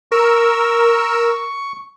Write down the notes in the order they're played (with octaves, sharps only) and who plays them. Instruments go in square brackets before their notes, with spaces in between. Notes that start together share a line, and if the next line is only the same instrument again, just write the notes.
[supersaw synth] A#4 E6 [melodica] C#6